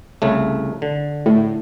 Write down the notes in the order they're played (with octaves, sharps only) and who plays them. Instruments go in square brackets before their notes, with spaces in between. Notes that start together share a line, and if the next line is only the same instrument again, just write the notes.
[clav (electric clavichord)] C2 C#3 A3
D3
[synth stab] A2